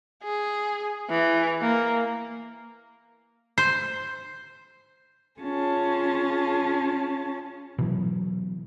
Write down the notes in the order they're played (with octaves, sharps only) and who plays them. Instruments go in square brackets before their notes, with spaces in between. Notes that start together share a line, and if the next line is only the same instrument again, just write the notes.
[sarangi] G#4
E3
A#3
[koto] C5
[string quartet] C#4 F4 G#4 A5
[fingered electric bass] B2 E3 F#3